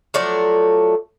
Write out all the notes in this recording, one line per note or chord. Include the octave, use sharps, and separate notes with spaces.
F3 F#3 A3 D5